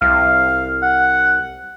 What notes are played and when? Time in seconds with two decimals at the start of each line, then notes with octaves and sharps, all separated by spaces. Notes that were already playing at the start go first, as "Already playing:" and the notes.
0.02 C2 F5
0.82 F#5